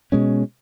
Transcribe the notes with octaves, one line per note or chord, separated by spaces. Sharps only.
B2 G#3 C#4